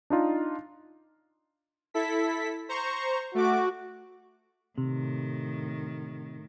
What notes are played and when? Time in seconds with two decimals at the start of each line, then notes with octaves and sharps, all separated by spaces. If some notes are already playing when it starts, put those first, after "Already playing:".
0.10 D4 D#4 F4
1.94 E4 A4 B6
2.69 C5 A#5 C#6
3.35 A3 F#4 D6
4.78 A2 C3 D#3